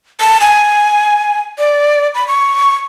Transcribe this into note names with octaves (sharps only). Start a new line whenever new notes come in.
A5
G#5
D5
B5
C#6